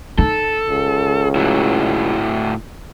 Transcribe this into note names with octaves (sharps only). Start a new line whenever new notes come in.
D#4 A4
C#2
A2 E4 F#4